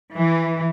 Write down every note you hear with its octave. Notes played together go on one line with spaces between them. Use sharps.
E3